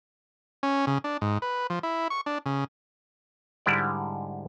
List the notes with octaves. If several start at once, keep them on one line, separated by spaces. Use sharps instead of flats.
C#4
C#3
D4
G#2
B4
F3
E4
C#6
D4
C#3
G#2 D3 G3 G#3 E4 D5